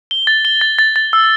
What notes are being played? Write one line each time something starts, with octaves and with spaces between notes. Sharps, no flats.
G7
A6
G7
A6
A6
A6
E6